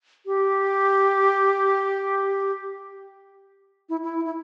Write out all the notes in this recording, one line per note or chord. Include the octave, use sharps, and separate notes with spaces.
G4
E4
E4
E4